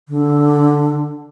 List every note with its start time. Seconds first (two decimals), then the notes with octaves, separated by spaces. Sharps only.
0.09 D3